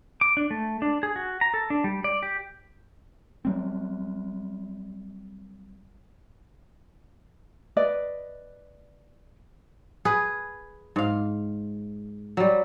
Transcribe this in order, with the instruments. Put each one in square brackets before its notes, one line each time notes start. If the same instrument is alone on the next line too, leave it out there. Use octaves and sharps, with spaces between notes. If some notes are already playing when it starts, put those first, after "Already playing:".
[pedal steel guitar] D6
D4
A3
D4
G#4
F#4
A#5
A4
D4
G3
D5
G4
[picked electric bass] F#3 G3 C4
[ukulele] B4 D5 D#5
[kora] G#4 B4
G#2 F5
F#3 G3